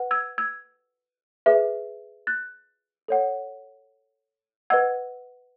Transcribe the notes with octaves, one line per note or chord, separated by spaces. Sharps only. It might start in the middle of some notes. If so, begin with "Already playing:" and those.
Already playing: B4 F#5
E6 G#6
E6 G#6
G#4 B4 E5
F#6 A6
A4 C#5 F#5
B4 D#5 F#5 E6 G#6